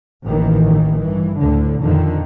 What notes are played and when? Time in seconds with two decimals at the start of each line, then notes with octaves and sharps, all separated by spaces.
0.25 A1 D#2 D#3 E3
1.01 G2 E3
1.39 D2 A2 D3
1.82 F2 A#2 D3 D#3